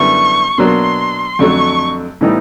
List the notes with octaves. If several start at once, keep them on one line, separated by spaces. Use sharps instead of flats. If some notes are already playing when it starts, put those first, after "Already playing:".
Already playing: F#2 D3 G3 B3 E4 C#6
B2 F#3 A#3 D4 C6
F2 D3 F#3 A3 C#6
A2 E3 G3 B3 D#4